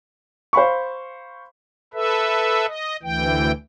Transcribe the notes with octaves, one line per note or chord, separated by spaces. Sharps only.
C5 F5 B5 C#6
A4 B4 E5
D#5
D2 E3 G5